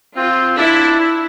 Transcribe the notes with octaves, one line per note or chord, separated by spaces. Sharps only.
C4 F4
D4 E4
E4